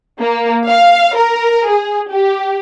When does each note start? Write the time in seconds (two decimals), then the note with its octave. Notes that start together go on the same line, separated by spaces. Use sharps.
0.20 A#3
0.68 F5
1.16 A#4
1.69 G#4
2.13 G4